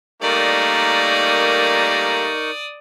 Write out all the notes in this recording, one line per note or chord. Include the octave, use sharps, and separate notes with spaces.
G3 A3 A#3 D#4 A#4 D5 C#6 D#6